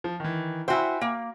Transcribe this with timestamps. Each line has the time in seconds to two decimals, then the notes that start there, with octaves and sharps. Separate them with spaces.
0.04 F3
0.20 D#3 E3
0.68 E4 F#4 C5 E5 G5 G#5
1.01 A#3